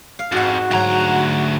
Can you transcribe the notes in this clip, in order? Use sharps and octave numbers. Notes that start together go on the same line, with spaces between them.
F5
F2 G#2 F#4 F#5
D2 G#2 F#3 A#5